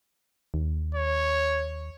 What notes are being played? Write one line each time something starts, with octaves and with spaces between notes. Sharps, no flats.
D#2
C#5